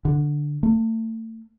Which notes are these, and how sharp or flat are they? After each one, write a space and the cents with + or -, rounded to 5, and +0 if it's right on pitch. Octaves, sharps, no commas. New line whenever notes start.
D3 +5
A3 +35